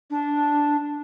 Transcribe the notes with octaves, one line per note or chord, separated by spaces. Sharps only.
D4